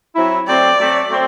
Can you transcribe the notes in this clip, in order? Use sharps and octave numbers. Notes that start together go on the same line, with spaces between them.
F#3 C4 E4
F#3 A3 C4 D5
F#3 A3 C4
F#3 A3 C4